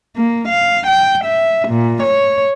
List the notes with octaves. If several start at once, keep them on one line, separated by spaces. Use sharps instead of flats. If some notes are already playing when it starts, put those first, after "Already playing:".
A#3
F5
G5
E5
A#2
C#5